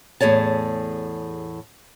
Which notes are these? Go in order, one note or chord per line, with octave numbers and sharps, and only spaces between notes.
E2 A2 G#4 C#5 A5